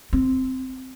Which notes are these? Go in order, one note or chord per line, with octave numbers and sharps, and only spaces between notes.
C4